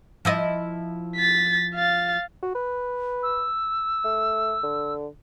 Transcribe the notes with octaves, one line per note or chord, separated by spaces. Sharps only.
F3 E4 D#5
A6 B6
F5 A6
F#4
B4
E6
A3
D3